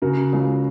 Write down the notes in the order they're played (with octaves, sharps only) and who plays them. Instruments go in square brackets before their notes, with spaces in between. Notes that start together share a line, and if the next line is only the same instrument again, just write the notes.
[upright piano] C#3 F#4 A#4
C#2